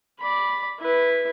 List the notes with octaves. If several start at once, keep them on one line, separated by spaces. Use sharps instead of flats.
D5 B5
E4 B4